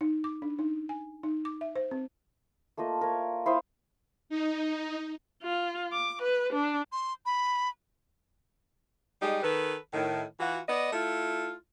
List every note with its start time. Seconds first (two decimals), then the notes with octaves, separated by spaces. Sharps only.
0.01 D#4
0.24 D6
0.42 D4
0.59 D#4
0.89 G#5
1.23 D#4
1.45 D6
1.61 E5
1.76 C5
1.91 C4
2.77 A3 A#3 F4 D#5
3.01 A#4 C#5
3.46 E4 C5 F5 D#6
4.29 D#4
5.42 F4
5.92 D6
6.22 B4
6.53 D4
6.92 C6
7.26 B5
9.22 G3 G#3 D#4 G4
9.43 D#3 A4 B4
9.93 A2 D#3
10.40 E3 F4 F#4
10.68 B3 D5 D#5
10.92 A3 E4 F4